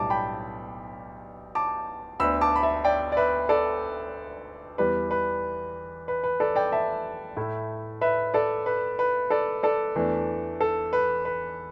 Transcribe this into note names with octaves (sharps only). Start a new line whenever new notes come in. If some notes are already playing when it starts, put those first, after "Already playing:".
Already playing: B1 A2 G3 D4 A5 D6
G5 B5
A5 D6
D2 D3 B3 D4 B5 E6
A5 D6
B5
E5 A5
D5 G5
D5
B4 E5
A4 D5
E2 E3 G3 B4
B4
B4
B4
A4 D5
D5 G5
E5 A5
A2 A3 E4
B4 E5
A4 D5
B4
B4
A4 D5
A4 D5
E2 E3 A3 D4
A4
B4
B4